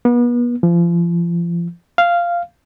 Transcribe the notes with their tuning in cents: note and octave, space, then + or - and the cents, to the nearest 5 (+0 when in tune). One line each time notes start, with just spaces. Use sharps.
B3 -35
F3 -35
F5 -10